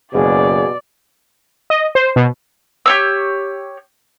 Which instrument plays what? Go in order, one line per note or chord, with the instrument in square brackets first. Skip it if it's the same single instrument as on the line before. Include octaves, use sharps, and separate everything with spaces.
[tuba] F#1 [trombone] B2 [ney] G#4 [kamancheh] D5
[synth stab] D#5
C5
B2
[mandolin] G4 C#5 E6